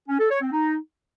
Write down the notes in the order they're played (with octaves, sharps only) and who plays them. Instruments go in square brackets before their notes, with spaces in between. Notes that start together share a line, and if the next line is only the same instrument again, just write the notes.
[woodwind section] C#4
A4
C#5
C4
D#4